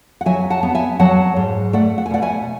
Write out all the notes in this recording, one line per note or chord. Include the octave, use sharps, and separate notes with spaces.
F#5
F#3 E5 G#5
F#5 A5
B3
E5 G#5
F#3 F#5 A5
G#2
A3 D5 F#5
F#5
G#5
B2 D5 F#5
E5 G#5